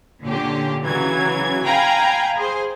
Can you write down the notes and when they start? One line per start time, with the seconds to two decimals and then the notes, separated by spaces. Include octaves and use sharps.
0.24 A#2 D3 C#4 G4
0.85 C#3 E3 F#3 G#6
1.65 F5 G5 G#5 A#5 B5
2.37 G#4 C5